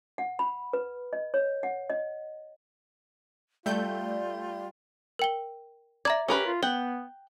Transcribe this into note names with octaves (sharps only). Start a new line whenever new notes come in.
F#5
B5
B4
D#5
C#5
F#5
D#5
G3 A3 F4 D5 G6
A#4 G5 G7
D5 E5 A#5 G#6
C#4 G4 A#4 B4
F4
B3 F#5 G5 G7